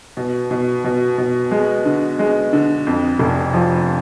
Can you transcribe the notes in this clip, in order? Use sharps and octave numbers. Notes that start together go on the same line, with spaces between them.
B2
B2
B2
B2
G#3
D3
G#3
D3
F2
F1
F3